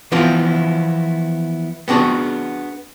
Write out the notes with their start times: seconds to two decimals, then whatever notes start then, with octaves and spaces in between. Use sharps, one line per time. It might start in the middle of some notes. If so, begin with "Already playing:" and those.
0.12 E3 F3 B3 C4 E4 F4
1.88 B3 C4 D4 F#4 G#4